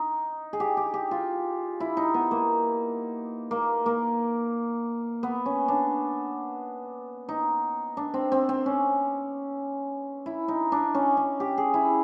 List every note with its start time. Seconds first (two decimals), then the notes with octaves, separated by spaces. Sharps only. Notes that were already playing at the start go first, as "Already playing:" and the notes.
Already playing: D#4
0.53 G#4
0.60 G4
0.77 G4
0.94 G4
1.11 F4
1.80 E4
1.97 D#4
2.14 B3
2.31 A#3
3.51 A#3
3.86 A#3
5.23 B3
5.46 C#4
5.68 D4
7.29 D#4
7.97 D4
8.14 C4
8.32 C4
8.49 C4
8.66 C#4
10.26 E4
10.48 D#4
10.72 D4
10.95 C#4
11.17 C#4
11.40 G4
11.58 G#4
11.74 E4